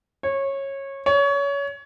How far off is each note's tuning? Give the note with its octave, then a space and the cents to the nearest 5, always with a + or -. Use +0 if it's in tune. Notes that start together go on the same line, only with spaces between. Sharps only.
C#5 -20
C#5 +25